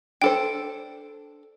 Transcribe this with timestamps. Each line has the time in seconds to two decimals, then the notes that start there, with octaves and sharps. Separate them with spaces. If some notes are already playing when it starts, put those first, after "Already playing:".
0.22 D4 A4 C5 G5